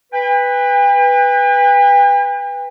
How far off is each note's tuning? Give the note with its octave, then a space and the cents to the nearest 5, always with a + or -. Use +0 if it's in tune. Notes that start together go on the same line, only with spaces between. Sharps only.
B4 +0 G5 +45